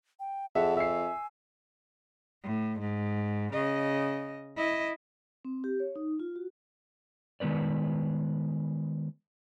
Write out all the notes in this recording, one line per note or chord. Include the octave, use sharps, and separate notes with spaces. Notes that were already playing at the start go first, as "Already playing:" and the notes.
G5
F2 G#4 E5 F#5 A5
E5 G#5 E6 C7
A2
G#2
C#3 D#5
E4 D#5
C4
G4
C#5
D#4
F4
F#4
D#3 G#3 B3 B4 D5